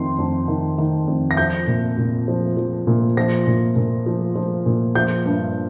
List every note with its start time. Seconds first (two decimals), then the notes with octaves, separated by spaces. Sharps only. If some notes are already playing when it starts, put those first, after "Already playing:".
Already playing: F2 D#3 C6
0.19 F2
0.48 D#3
0.78 D#3
1.07 F2
1.31 A#6
1.37 F3 G6
1.67 A#2
1.97 A#2
2.28 F3
2.57 F3
2.87 A#2
3.17 F3 A#6
3.47 A#2
3.76 A#2
4.06 F3
4.36 F3
4.66 A#2
4.95 F3 G6
5.26 G2